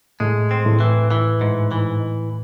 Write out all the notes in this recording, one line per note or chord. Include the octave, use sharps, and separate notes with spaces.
A2 G#3 A3
C4
A2 A3
E3
E3
G#2
E3